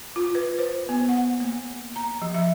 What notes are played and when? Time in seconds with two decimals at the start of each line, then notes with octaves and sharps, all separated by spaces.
0.16 F4
0.35 B4
0.59 C5
0.89 B3
1.09 F#5
1.40 A#3
1.96 A#5
2.22 F3
2.34 E5